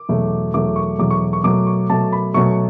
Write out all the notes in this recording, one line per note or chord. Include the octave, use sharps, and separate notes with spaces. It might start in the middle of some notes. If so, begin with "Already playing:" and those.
Already playing: D6
E2 B2 F#3 A3
E2 B2 F#3 A3 D6
C#6
E2 B2 F#3 A3 D6
C#6
C#6
B2 F#3 A3 D6
C#6
B2 F#3 A3 A5
B5
B2 F#3 A3 C#6